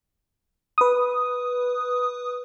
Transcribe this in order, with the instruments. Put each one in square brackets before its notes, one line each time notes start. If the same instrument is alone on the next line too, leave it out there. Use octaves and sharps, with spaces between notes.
[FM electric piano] B4 D#6